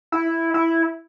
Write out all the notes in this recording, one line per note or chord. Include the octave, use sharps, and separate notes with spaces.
E4
E4